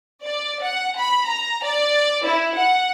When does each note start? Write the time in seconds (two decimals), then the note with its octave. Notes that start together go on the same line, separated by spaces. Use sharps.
0.23 D5
0.63 F#5
0.97 B5
1.28 A#5
1.63 D5
2.25 E4
2.57 F#5